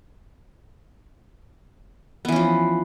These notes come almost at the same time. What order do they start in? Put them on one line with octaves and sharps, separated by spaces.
B3 E3 C#4 F3